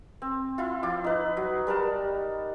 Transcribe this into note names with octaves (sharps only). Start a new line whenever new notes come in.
C4
E4 F4
F3 E4 D6
D#4 B4
F#3
G3 A#4 F#5 A5